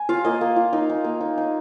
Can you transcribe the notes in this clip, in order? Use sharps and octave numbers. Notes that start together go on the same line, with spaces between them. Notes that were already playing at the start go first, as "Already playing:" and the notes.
Already playing: G#5
F4 F5
A#3 D#5
A#3
F4
D#4
D#4
A#3
D#4
D#4